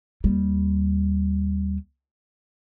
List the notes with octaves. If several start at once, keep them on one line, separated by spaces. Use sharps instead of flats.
D#2 G3